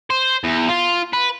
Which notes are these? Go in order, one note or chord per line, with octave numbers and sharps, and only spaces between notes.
C5
E2
F4
B4